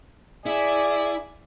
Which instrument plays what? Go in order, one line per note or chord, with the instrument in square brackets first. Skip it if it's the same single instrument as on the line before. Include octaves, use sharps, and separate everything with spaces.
[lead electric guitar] E4 [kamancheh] G#4 [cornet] D5